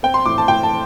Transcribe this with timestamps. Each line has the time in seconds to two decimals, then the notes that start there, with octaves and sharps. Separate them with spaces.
0.03 C4 G5
0.14 C6
0.26 A2 D6
0.38 A5
0.48 A2 G5
0.63 A5